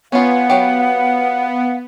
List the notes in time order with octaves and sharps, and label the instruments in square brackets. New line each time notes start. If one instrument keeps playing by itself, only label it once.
[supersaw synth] B3 [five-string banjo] C#4 F4 [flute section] F5 F#5
[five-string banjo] F#3 G4